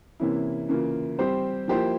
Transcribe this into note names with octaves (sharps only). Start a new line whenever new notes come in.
C3 E3 A#3 C#4 E4
C#3 E3 A#3 F4
G3 C4 G4 C5
F3 A#3 E4 G4 C5